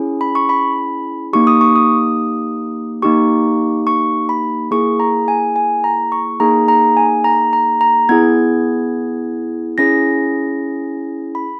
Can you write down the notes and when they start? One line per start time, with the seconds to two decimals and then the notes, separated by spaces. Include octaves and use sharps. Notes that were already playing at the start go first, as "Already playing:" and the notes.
Already playing: C#4 E4 G#4
0.21 B5
0.35 C#6
0.49 B5
1.33 A#3 D#4 G4 C#6
1.47 D#6
1.61 C#6
1.76 D#6
3.02 A#3 D#4 G4 C#6
3.87 C#6
4.29 B5
4.71 A#3 E4 G#4 C#6
5.00 A#5
5.28 G#5
5.56 G#5
5.84 A#5
6.12 C#6
6.40 A#3 D#4 G#4 A#5
6.68 A#5
6.97 G#5
7.24 A#5
7.53 A#5
7.81 A#5
8.09 B3 E4 G#4 G#6
9.78 C#4 E4 G#4 A#6
11.35 B5